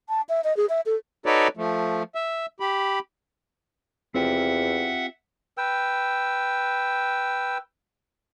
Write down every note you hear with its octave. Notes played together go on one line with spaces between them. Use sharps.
A5
E5
D#5
G#4
E5
A4
D#4 F#4 A4 B4 C#5 D5
F3 A3
E5
G4 B5
E2 C4 F4 G4 E5 F#5
B4 G5 E6